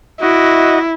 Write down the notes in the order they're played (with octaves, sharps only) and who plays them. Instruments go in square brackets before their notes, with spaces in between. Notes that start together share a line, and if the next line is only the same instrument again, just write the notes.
[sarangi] E4 [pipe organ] F#4 D#5